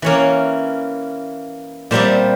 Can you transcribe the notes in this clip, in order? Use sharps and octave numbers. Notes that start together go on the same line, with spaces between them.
E3 A#3 C#4 C#5 F5
A#2 G3 C4 C5 E5